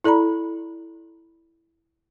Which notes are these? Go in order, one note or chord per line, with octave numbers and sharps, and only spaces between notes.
E4 A4 D5 A#5 B5